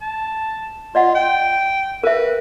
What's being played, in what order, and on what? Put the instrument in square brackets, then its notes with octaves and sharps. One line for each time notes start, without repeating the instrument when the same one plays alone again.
[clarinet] A5
[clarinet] F4 [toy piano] D5 D#5 F#5
[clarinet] G5
[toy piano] A#4 E5 [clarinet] B4